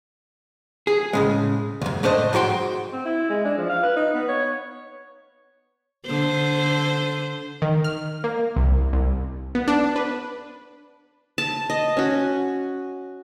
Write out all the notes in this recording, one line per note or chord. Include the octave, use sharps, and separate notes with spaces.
G#4
A2 C#3 G#3
C#2 F#2
A2 A3 D4 C5 D#5
G#2 F#3 F#4 G5 C6
C4
E4
G#3
D4
F3
F5
B4
D#4
B3
C#5
D3 C5
D#3
F6
A#3
C2
C2
B3
D4
B4
A5
D#5
C#4 F#4